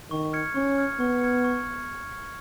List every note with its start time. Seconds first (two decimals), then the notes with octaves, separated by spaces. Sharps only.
0.11 D#3 C#6
0.33 F6 G#6 C#7
0.55 C#4 C#6
0.78 F6 G#6 C#7
1.00 B3 C#6
1.21 F6 G#6 C#7
1.44 C#6